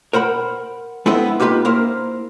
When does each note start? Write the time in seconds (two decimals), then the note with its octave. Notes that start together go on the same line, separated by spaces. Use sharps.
0.13 A#4 C5 F#5 B5
1.06 G#3 B3 C4 E4 A4 D#5
1.40 A#3 D#4 F4 G4 B4
1.65 A#3 E4 A#4 C5